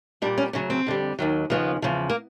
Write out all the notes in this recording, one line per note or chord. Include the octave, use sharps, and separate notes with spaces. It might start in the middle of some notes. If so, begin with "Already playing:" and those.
A#2 G3 D4
C#4
D2 C#3 F#3 C#4
C4
F2 D3 G3
D#2 D#3 F#3
D#2 C#3 F3 B3
E2 C#3 F3
A#3